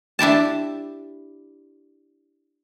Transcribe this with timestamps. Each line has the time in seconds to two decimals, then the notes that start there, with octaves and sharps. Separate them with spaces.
0.19 D4 E4 G4 A5